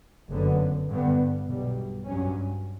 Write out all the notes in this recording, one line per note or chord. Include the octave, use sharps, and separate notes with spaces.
F#1 F#2 D3 F#3 B3
G2 D3 G3 B3
B1 B2 G3
G2 F#3 C#4